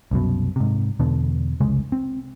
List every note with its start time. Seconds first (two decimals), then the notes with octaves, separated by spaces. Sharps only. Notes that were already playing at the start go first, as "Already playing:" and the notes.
0.11 C2 F#2 B2
0.56 G#2 C3
1.00 E2 B2 D3
1.60 F1 C2 C#3 G#3
1.92 C4